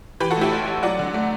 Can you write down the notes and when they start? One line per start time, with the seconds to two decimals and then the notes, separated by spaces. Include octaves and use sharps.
0.20 E3 G4 B4
0.30 F#4 A4
0.37 A2 E4 G4
0.52 A1
0.67 A1
0.83 F#3 D5 F#5
0.99 D3
1.14 A3